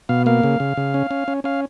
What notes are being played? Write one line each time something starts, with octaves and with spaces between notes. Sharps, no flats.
B2 F5
A#3 F5
C#3
C#3
C#3
C#4
C#4
C#4
C#4 F5